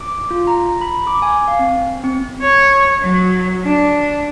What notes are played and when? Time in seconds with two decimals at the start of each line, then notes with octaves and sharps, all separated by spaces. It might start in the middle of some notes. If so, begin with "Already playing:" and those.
0.01 D6
0.31 F4
0.47 A#5
0.81 B5
1.07 D6
1.22 G#5
1.48 F5
1.59 C4
2.04 C4
2.41 C#5
3.02 F#3
3.65 D4